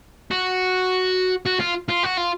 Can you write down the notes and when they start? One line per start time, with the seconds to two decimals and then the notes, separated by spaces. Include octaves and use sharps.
0.31 F#4
1.46 F#4
1.60 F4
1.89 F4
2.03 F#4
2.17 F4